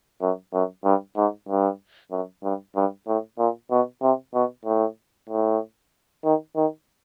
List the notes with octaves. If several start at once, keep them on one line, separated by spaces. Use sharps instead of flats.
F#2
F#2
G2
G#2
G2
F#2
G2
G2
A2
A#2
B2
C3
B2
A2
A2
D#3
D#3